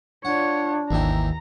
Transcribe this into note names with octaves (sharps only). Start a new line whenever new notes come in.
D4 F4 C#5 F#5
G#1 D#2 E3 G4 A#5